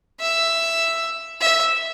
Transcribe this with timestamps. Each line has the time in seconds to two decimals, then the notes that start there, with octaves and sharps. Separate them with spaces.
0.20 E5
1.41 E5